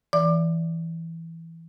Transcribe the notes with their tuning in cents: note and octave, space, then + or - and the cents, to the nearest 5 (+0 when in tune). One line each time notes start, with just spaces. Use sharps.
E3 +0 D5 -15 D6 +30